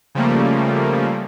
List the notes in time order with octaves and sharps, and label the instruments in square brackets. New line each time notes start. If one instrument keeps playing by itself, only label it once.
[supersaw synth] C#3 F3 G3 A3 A#3